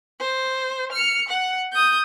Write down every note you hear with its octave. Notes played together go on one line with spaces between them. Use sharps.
C5
F6 C#7
F#5
D#6 G6